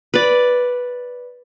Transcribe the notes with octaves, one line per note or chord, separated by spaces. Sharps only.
B4 D5